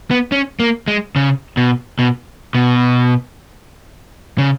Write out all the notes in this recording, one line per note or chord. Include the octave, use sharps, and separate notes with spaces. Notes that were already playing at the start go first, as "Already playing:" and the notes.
B3
C#4
A#3
G#3
C#3
B2
B2
B2
C#3